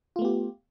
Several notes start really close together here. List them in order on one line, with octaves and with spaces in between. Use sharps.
F4 A3 B3 G4